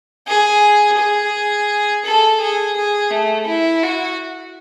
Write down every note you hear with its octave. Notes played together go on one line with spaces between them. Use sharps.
G#4
G#4
A4
G#4
G#4
A3
E4
F#4